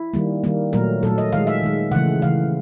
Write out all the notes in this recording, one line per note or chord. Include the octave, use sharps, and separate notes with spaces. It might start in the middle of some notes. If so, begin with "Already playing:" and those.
Already playing: E4
D#3 G3 A#3
D#3 G3 A#3
A#2 F#3 A3 A#4
A#2 F#3 A3 A4
D#5
D#3 G#3 F5
E5
D#3 G#3
C#3 E3 A3 F#5
C#3 E3 A3 F5